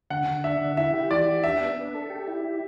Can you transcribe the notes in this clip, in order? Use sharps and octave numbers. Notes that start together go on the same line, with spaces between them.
D3 F#5
D3
D4 E5
D3
E4 E5
G4
E3 D5
G4
D4 E5
B3
D4
A4
G4
E4
G4